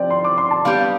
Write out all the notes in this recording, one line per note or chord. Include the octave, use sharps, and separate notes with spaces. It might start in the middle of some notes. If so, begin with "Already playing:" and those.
Already playing: F3 C4 G4 D5
C6
D6
C6
A5
G3 B3 D4 G4 F5